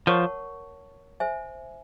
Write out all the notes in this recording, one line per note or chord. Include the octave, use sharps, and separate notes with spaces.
F3 A#4 C#5 F#5 A5 C#6
C5 E5 G#5